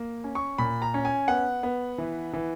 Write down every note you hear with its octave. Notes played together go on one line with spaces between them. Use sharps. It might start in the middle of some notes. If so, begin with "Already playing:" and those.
Already playing: A#3
C#4
C#6
A#2 B5
A#5
C#4
G#5
B3 F#5
B3
E3
E3